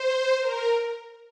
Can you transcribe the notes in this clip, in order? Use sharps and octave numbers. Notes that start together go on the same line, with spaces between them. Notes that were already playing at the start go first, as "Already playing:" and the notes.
Already playing: C5
A#4